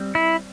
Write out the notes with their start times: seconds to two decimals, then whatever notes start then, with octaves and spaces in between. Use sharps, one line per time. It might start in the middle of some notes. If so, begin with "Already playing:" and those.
Already playing: G3 C4
0.15 E4